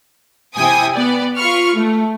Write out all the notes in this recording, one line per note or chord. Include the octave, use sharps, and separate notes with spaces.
C3 E4 G5 G#5 D#6
B3 D5
F4 B5 C#6 F6
A3